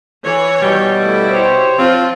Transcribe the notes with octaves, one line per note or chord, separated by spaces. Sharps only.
E3 C#5
B2 G3 G5
A3 E4
G4 C5 C#5
F3 C4 F4